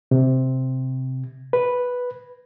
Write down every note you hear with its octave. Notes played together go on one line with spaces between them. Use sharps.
C3
B4